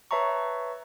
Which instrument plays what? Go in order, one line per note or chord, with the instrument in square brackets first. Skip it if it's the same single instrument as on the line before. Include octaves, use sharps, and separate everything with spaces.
[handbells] B4 C#5 E5 A5 A#5 C#6